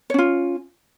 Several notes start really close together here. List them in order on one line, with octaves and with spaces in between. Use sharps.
C#5 C#4 F4